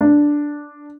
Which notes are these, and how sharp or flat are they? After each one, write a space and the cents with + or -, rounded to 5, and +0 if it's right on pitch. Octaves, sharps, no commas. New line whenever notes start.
D4 +0